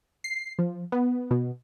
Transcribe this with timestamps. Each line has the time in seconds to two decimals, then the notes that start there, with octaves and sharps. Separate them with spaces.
0.24 C7
0.59 F3
0.92 B3
1.31 B2